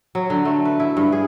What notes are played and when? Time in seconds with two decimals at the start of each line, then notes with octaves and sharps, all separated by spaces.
0.15 F#3
0.30 D3
0.45 A3
0.65 B4
0.80 E4
0.97 G2
1.12 G#4